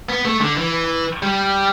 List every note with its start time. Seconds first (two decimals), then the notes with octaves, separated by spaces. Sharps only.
0.09 B3
0.25 A3
0.41 D3
0.57 E3
1.23 G3